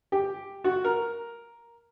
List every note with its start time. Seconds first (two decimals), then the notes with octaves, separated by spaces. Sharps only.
0.12 G4
0.64 F#4
0.84 A#4